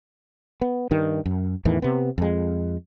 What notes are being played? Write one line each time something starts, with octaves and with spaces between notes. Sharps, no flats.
B3
G2 D#3
F#2
E2 A2 D#3 E3
C3 B3
F2 G#3